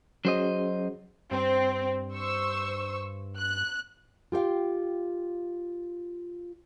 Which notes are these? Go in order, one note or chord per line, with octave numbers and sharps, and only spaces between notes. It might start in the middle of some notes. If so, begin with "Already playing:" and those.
F#3 C#4 F#4 G#4 C5 D#5
G2 C4
C5 C#6 E6
F#6
F4 G4 A4 F5 G5